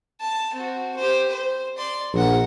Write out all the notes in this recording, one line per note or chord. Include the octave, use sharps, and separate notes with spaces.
A5
C4 F#4
G4 C5
C5
D5 C6
A#1 A#4 F#5